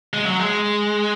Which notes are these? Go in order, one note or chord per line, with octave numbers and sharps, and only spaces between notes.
G#3
F#3
G#3